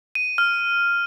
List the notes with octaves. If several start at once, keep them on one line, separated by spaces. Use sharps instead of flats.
D#7
F6